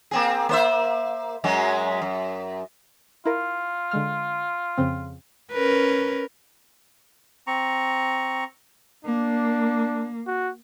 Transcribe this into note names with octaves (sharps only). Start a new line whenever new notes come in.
A#3 C4 G#4
A#3 C5 E5
F#2 F#3 G#3
F#2
E4 F4 A#4
D3 G#3 F6
F2 C#3 C4
C#4 A#4 B4
C4 A#5 C#6
A#3 D4
F#4